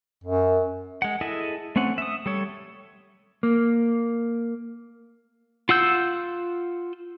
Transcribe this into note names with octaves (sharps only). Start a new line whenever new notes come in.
F#2
G#3 F#5
E4 G#4 A4 D#5 E5
A3 C4 C#4 F#5
E5 D#6
G3 A4 C#5
A#3
F4 F#5 E6 G6